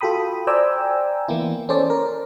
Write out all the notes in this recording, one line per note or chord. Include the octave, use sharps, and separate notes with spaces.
F4 F#4 A4 G5 B5 D#6
C5 D5 G5 G#5 A#5 E6
E3 A#3 B3 E4
C#4 A4 C5 D5
A#4